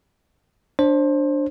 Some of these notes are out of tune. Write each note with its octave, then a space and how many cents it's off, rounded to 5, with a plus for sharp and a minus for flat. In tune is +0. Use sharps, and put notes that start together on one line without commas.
D4 +0 C5 +25